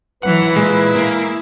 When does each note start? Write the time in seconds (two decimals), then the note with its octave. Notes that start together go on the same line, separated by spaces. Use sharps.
0.23 E3 F#3 B4 F#5
0.56 A#2 G#3 E4
0.95 A#3